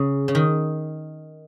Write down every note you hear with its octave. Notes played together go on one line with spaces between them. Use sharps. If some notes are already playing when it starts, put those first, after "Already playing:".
Already playing: C#3
C#3
D#3